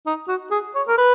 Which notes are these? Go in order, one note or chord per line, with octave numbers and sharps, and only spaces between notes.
D#4
F#4
G#4
C#5
A#4
B4